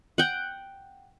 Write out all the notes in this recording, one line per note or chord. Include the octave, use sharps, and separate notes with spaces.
F#5 G5